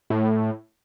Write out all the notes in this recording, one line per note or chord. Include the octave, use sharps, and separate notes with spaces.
A2